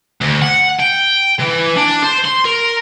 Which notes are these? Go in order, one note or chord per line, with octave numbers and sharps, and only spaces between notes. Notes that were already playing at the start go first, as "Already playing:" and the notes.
D2
F#5
G5
E3
D4
C5
C6
A#4